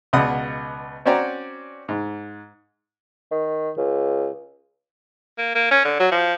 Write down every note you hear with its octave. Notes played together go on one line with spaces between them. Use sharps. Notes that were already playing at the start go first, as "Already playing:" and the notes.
C#2 B2 D5 F#5 D#6
C4 C#4 F#4 D5 G5 A#5
G#2
D#3
C#2
A#3
A#3
C#4
D3
F#3
F3